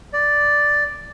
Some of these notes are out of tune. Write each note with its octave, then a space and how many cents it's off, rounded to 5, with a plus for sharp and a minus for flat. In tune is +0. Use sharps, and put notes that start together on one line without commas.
D5 +0